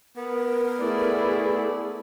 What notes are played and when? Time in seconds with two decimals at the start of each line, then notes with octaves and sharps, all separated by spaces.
0.17 B3 A#4
0.79 A3 E4 G#4 D5